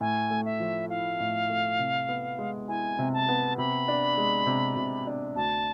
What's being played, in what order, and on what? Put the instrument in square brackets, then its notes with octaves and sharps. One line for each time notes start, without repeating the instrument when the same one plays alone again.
[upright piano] A2 [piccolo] G#5
[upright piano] A3
[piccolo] E5
[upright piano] F3
[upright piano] E4 [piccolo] F5
[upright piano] A2
A3
C3
B3
G#3
[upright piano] E4 [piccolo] G#5
[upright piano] C3
[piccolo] A5
[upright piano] B3
[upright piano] C3 [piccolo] B5
[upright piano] D4
G#3
C3
C3
D4
[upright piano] D2 [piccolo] A5